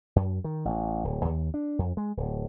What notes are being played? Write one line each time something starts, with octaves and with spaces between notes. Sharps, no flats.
F#2
D#3
A1
D1
D#2
D4
F2
G#3
D1